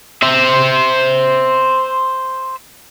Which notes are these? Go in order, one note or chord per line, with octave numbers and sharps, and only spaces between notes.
C5 E5